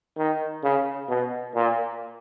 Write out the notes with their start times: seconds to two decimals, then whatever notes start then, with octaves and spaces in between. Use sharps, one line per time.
0.17 D#3
0.63 C#3
1.09 B2
1.55 A#2